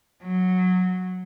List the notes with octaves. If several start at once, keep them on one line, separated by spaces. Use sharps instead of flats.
F#3